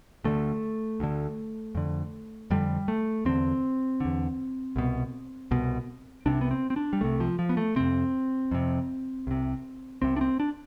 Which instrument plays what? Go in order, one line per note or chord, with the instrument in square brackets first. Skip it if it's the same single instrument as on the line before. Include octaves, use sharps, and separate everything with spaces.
[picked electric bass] D2 D3 A3
D2 D3
F2 D3
F2 D3 G3
A3
E2 D3 C4
E2 D3
C2 B2
C2 B2
C2 C3 D4
B3
C4
C4
D4
G3
C2 C3 A3
F3
F3
B3
A3
F2 C3 C4
F2 C3
C2 C3
C2 C3 C4
D4
C4
D4